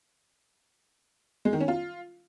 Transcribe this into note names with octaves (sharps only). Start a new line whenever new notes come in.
G#3
D#3
C#4
F4